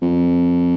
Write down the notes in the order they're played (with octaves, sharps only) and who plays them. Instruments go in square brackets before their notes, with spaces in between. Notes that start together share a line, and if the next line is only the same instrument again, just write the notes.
[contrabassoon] F2